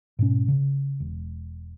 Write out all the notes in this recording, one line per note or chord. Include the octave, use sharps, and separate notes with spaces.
G#2 B2 C#4
C#3
E1